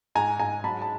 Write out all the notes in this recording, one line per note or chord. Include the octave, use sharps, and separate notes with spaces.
G#2 G#5 A#5
G#2 G#5 A#5
F#3 A5 B5
A5